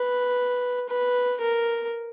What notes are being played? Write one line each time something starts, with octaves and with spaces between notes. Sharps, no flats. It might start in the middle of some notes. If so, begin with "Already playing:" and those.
Already playing: B4
B4
A#4